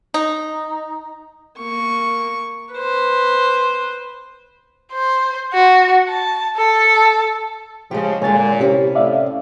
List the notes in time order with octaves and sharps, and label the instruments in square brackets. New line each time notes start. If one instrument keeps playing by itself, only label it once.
[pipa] D#4
[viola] A#3 C#6
B4 C5
[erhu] C5
F#4
A5
A4
[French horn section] C#3 F3 [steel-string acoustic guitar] G#3 G4
[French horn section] A#2 [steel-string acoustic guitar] D3 C#5 [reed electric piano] G#3 G#5 A6
[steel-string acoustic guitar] C3 C#4 E4 [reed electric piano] G4
[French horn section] A2 [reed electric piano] D5 E5 F5